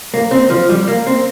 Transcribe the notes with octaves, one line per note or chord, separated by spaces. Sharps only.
A#3
C4
F3
G3
A#3
C4